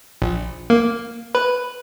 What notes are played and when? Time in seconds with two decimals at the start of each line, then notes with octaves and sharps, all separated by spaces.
0.22 A#1
0.70 A#3
1.35 B4